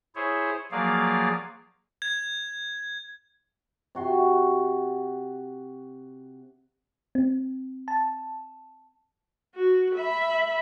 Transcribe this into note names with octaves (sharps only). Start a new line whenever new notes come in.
E4 G#4 C5 C#5
F3 F#3 A#3 G#4 D5 F5
G#6
C3 F#4 C6
C4
A5
F#4
E5 B5